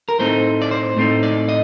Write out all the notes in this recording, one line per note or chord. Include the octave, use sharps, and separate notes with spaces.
A#4
A2 A3 C4 D#4 C5
D5
C5
A2 A3 C4 D#4
D5
D#5